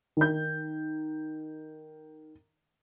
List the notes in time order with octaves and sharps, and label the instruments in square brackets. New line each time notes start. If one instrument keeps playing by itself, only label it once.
[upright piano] D#3 G6